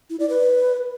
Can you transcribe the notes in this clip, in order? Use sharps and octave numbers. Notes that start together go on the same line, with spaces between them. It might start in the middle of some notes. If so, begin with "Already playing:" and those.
E4
D5
B4